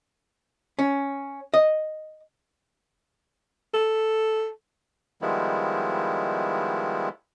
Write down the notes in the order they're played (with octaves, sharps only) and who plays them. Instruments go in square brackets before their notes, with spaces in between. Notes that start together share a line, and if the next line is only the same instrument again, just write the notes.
[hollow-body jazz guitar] C#4
D#5
[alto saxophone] A4
[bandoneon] D#3 F3 G3 G#3 B3 E4